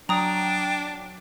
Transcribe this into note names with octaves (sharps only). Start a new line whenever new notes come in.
F#3 D4 G5 A#5 D#6